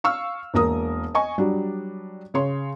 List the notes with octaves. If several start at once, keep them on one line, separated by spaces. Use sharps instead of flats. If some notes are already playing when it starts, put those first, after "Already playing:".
F5 C#6 E6 F6
E1 A#3 A#4 D#6
D#5 G#5 C#6
F#3 G3 D4
C#3 C#5 C6